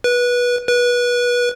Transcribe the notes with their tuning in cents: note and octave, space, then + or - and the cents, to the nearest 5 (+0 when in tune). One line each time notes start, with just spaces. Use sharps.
B4 -20
B4 -25